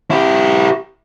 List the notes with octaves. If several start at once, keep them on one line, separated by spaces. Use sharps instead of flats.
E4 G4